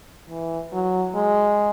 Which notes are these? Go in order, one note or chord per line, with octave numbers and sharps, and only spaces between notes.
E3
F#3
G#3